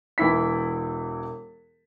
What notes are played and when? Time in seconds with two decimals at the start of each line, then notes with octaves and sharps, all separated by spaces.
0.18 E1 E3 E4 B6